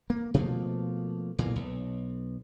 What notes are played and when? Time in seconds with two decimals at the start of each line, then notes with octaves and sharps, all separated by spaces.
0.10 A#3
0.34 B2 F3 A3 A#3
1.38 B1 A#2 E3 A#3
1.56 B1